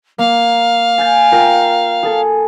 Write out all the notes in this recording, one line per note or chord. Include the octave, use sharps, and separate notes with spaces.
A#3 F5
G#5 G6 A6
F4 A#4 G5
G#4 A4